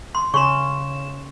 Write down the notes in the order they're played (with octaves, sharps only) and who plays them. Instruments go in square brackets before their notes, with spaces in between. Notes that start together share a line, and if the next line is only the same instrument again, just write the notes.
[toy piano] C6
[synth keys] C#3 E7 [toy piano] C6 C#6